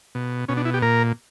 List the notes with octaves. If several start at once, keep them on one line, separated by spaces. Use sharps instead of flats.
B2
B2 C#4
D4
E4
G4
A#2 A#4